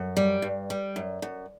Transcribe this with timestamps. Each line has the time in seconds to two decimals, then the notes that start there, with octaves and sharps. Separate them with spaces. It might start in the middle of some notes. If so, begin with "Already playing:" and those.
Already playing: F#2
0.17 G3
0.42 G2
0.70 G3
0.96 F#2
1.22 F#2